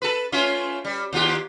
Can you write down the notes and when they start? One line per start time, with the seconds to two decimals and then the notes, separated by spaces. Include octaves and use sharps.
0.02 A4 B4
0.32 A3 C#4 F4
0.85 G3
1.13 D#2 F4 G4